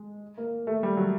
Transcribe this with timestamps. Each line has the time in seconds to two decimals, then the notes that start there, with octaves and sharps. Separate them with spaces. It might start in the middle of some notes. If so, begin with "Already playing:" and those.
Already playing: G#3
0.38 A#3
0.67 A3
0.83 G3
0.97 F#3